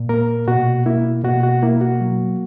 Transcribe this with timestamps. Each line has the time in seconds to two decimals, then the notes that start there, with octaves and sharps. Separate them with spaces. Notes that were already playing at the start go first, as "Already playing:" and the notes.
Already playing: A#2
0.09 A#3 A#4
0.48 B2 F#4
0.86 A#3 E4
1.24 B2 F#4
1.43 F#4
1.62 A#3 E4
1.81 F#4
2.01 F#3